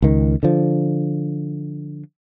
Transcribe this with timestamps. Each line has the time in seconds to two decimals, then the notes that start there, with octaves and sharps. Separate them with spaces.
0.02 C#2 D#3
0.43 D3 F3